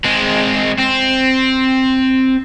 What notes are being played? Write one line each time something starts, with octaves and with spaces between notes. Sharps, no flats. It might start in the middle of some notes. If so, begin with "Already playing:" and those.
G#3 C4
C4